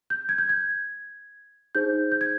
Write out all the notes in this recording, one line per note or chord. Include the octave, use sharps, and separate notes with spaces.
G6
G#6
G6
G#6
D#4 G#4 C5 G6
G6
G#6